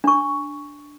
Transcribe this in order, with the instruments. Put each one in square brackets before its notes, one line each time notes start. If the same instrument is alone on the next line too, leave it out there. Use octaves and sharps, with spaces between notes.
[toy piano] D4 C#6